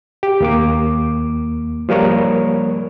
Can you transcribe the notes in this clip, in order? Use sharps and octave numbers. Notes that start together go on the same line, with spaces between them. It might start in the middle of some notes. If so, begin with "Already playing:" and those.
G4
D#2 A#3 D6
F3 G3 A#3 A#4 C#5